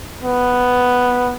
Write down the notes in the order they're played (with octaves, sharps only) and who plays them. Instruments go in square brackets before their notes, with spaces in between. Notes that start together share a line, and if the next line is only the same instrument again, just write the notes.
[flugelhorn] B3